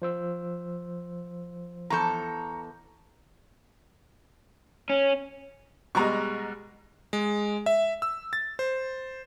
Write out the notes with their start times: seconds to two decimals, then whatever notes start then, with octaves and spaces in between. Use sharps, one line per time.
0.02 F3 C5 E6
1.90 E2 A4 A#5 C#6 G6
4.89 C#4
5.95 B2 G3 G#3 D#5 A#5 C#6
7.13 G#3
7.66 E5
8.02 E6
8.33 A6
8.59 C5